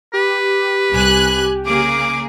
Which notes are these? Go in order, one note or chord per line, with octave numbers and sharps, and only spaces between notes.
G4 B4
C2 G#5 F#6
C#3 A#3 G#4 D6